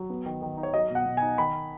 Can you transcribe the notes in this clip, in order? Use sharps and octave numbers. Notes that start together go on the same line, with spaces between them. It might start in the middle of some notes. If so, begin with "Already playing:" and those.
Already playing: F#3
B3
D#3
D#3
D#4
C#5
F#3 D#5
B2 F#5
B2
D#4 G#5
D#3 B5